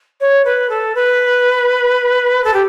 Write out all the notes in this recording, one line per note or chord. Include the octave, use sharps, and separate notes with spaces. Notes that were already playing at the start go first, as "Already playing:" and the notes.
C#5
B4
A4
B4
A4
G4